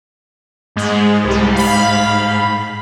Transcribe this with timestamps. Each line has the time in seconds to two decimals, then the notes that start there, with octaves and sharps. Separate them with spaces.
0.76 G#2 G#3
1.24 C2 G3
1.55 F5 B5